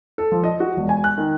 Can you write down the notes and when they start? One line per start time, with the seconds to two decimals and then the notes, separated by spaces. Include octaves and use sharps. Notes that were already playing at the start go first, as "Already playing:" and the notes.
0.18 A4
0.32 F3
0.44 D#5
0.60 F#4
0.77 E1
0.89 G#5
1.04 F#6
1.18 D#3